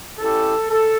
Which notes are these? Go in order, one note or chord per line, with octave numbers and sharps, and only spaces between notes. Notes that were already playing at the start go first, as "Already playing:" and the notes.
C#4 E4 G4 A4
A4